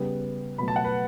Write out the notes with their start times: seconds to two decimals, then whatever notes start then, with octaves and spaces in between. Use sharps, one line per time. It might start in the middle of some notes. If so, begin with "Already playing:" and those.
Already playing: C#3 G3 B3
0.58 B2 F#3 A3 B5
0.68 A5
0.76 F#5
0.84 B4